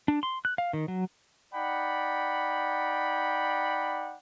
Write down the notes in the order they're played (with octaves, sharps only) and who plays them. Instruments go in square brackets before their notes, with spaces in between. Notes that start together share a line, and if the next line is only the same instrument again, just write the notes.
[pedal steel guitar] D4
C6
F#6
F5
D#3
F#3
[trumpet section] D#4 D5 F#5 G5 B5